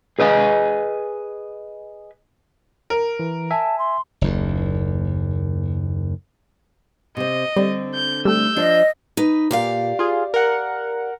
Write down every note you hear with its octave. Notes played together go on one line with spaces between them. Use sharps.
G#4 B4 D#5 F5 G#5
A#4
E3
E5 G#5 A5
C6
F#1 D#2
C3 C4 D#5
D3 G3 C4
G6
G3 A3 E6 G6
F3 D4 D#5
D#4 B4
A#2 G4 D5 F5
F4 G#4
A#4 F#5